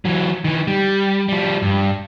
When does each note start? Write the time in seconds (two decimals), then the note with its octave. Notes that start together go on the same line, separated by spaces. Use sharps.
0.05 E3 F#3
0.44 D#3 E3
0.67 G3
1.29 F3 G3
1.62 G2